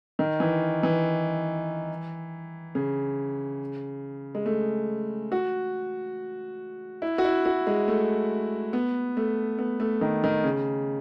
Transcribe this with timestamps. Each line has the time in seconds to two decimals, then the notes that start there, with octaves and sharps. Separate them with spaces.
0.19 D#3
0.40 E3
0.83 E3
2.75 C#3
4.35 G#3
4.46 A3
5.32 F#4
7.02 E4
7.18 F#4
7.24 E4
7.45 F#4
7.67 G#3
7.88 A3
8.73 B3
9.17 A3
9.59 B3
9.80 A3
10.01 D#3
10.24 D#3
10.44 C#3